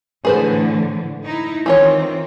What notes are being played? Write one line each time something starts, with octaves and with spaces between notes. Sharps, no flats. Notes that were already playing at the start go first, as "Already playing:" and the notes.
A2 D3 E3 G#4 B4 C5
D#4 E4
D#3 E3 C4 F4 C#5